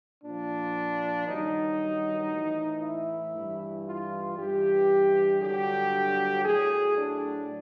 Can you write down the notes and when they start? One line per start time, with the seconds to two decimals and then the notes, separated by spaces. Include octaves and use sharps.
0.24 A#2 F3 D4
1.28 G2 D#3 F#3 D#4
2.30 A2 E3
2.83 E4
3.34 G2 E3
3.85 F4
4.38 G2 E3 G4
5.41 G2 D3 F#3 G4
6.44 A2 F#3 G#4
6.97 D4